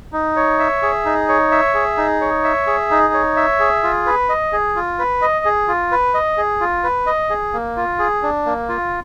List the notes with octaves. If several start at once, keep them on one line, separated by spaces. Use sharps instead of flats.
D#4
C#5
E5
G#4
D#4
C#5
E5
G#4
D#4
C#5
E5
G#4
D#4
C#5
E5
G#4
F4
B4
D#5
G#4
F4
B4
D#5
G#4
F4
B4
D#5
G#4
F4
B4
D#5
G#4
A#3
F4
G#4
D4
A#3
F4